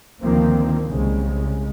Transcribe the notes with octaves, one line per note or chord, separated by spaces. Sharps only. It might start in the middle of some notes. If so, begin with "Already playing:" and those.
D2 G2 D#3 F3 A#3 C4
C2 C#3 G#3